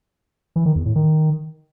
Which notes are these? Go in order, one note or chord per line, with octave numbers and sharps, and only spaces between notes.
E3
D#3
E2
A2
D#3